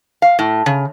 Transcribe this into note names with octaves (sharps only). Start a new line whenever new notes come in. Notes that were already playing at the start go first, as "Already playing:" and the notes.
F5
A2
C#3